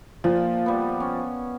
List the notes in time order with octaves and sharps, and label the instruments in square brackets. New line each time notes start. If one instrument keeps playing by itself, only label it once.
[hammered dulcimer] A#2 [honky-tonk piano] F3
[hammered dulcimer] G3 B3
C#4